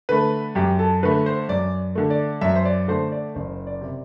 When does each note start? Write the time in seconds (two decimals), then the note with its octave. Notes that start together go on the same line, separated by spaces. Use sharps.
0.09 D3 A3 B4
0.55 F#2 G4
0.79 A4
1.03 D3 A3 B4
1.26 C5
1.49 F#2 D5
1.95 D3 A3
2.10 D5
2.41 F#2 E5
2.56 C5
2.65 D5
2.88 D3 A3 C5
3.12 D5
3.35 F#1 C5
3.67 D5
3.81 C3